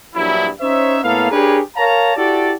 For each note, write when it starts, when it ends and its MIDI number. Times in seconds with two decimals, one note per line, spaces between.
0.16 0.48 34
0.16 0.48 43
0.16 0.48 54
0.16 0.48 64
0.61 0.99 61
0.61 0.99 63
0.61 0.99 72
0.61 0.99 73
0.61 0.99 76
1.03 1.30 45
1.03 1.30 58
1.03 1.30 59
1.03 1.30 69
1.03 1.30 77
1.32 1.61 62
1.32 1.61 67
1.32 1.61 68
1.32 1.61 70
1.32 1.61 71
1.32 1.61 73
1.77 2.14 70
1.77 2.14 73
1.77 2.14 77
1.77 2.14 81
1.77 2.14 82
2.17 2.52 64
2.17 2.52 66
2.17 2.52 67
2.17 2.52 69
2.17 2.52 74